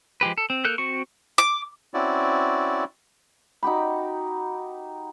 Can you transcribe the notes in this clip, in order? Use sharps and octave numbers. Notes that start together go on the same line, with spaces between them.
F3 G#3 G4 B4
A4
C4
A#3 A4 A#4 F#6 G6
C4 F#4 C#6
D6
C4 C#4 E4 F#4 D5
D#4 F#4 G4 B5